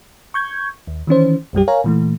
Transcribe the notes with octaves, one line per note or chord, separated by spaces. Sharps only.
C#6 G6 G#6
D#2
D#3 E3 C#4 C5
B1 F#2 G3 G4
A#4 C#5 F5 G#5 A#5
A#2 E3 A3